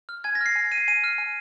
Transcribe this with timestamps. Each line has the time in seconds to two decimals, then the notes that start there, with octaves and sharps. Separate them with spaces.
0.09 F6
0.24 G#5 G#6
0.35 A#6
0.41 F6 C7
0.55 G#5
0.71 F6 D#7
0.77 C7
0.88 G#5 D#7
1.04 F6
1.18 G#5